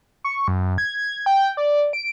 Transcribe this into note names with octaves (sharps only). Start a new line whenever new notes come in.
C#6
F#2
G#6
G5
D5
D7